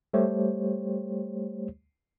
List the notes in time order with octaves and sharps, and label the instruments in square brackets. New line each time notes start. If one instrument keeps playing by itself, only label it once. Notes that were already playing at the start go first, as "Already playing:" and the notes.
[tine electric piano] G3 A3 G4 C5 C#5